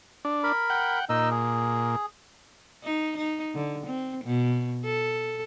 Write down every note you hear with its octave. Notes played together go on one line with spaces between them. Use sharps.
D4
A#4 B5
F#5 G5
A#2 D#4 D#5 E6
G#4
D#4
D#4
D3
C4
B2
A4